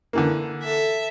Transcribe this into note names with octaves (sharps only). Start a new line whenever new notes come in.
D3 E3 A#3
A4 E5